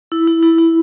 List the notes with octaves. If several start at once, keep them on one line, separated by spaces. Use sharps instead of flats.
E4
E4
E4
E4